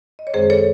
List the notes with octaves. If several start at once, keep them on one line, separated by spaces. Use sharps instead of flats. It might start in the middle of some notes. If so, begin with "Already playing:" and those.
D#5
C#5
F#2 D#3 G#3 C4 G#4 C5
A4 C#5